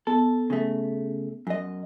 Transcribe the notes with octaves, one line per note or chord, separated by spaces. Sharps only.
B3 A4
C#3 A3
F#2 D#5